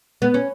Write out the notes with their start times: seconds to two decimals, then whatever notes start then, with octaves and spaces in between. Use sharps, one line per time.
0.22 B3
0.34 C#4